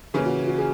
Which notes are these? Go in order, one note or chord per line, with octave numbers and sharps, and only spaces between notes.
C#3 E3 A#3 C#4 G#4
F#4
F#4
G#4